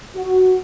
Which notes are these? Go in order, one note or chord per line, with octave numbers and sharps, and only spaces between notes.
F#4